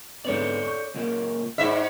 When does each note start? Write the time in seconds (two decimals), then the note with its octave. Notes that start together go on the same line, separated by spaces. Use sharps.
0.25 G#2 D3 B3 A4 C#5 D5
0.64 C#6 G6
0.94 C#2 A#2 A#3
1.58 G#2 D#4 E4 C5 D5 E5